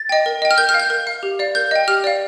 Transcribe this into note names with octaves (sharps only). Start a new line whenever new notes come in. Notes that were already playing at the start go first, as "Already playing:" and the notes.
Already playing: A6
D#5 G5
A#4
D#5 G5
F6
A#4 G6
F6
F5
G6
A#4
F5
G4
D5 F5
A#4 G6
D#5 G5
G4 F6
D5 F5